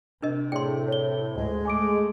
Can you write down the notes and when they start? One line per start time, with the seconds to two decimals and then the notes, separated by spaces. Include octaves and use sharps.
0.22 C3 D4 A#4 D#5
0.52 A2 G#4 D5 G5 C6
0.88 C#5 G7
1.36 D2 G#2 G#3
1.65 A3 G#5 D6 D7